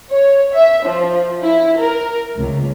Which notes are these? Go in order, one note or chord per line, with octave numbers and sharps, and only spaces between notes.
C#5
E5
F3
E4
A#4
C#2